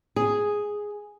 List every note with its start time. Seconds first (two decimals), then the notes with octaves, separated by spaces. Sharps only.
0.16 G#4